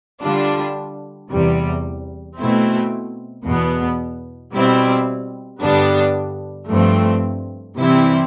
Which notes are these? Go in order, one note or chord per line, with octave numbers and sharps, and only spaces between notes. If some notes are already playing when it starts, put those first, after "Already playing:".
D3 G3 D4 F4
E2 C3 G3
B2 A3 C4 E4
E2 B2 B3
B2 G3 C4 E4
G2 D3 G3 B3 D4
G2 F3 A3 C4
C3 E3 G3 C4 E4